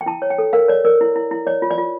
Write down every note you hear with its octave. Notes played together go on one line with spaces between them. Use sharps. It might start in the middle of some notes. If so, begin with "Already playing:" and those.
G5
E4 A5
C#5
G5
A4
A#4 F5
C#5 D5
A#4 D5
E4
E4
E4
C#5 D5
F4
D5
F4